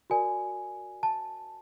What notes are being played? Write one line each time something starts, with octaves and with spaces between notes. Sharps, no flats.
F#4 A#4 D5 G#5
A5